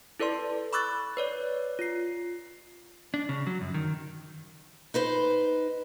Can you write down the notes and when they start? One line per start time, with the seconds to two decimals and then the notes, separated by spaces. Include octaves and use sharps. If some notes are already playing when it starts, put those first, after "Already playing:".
0.20 E4 A4 B4 D5 C6
0.73 B5 C#6 D6 E6 F#6 A6
1.17 B4 C#5 D5
1.79 F4 C7
3.14 D4
3.29 C#3
3.47 F#3
3.61 F#2
3.74 D#3
4.94 D#4 B4 C5